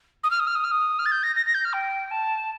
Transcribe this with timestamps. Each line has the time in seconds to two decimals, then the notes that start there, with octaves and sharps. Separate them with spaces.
0.24 D#6
0.31 F6
0.40 D#6
0.47 F6
0.55 D#6
0.64 F6
0.71 D#6
0.99 F6
1.06 A6
1.12 G6
1.23 A#6
1.36 A#6
1.46 A#6
1.54 G6
1.65 F6
1.73 G5
2.11 A5